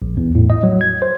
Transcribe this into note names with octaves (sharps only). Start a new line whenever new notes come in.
A#1
E2
A2
D#5
F#3
G#6
C5